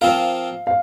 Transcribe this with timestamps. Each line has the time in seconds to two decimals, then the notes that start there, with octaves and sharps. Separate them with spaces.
0.01 F3 C4 F4 A#4 F5
0.67 F5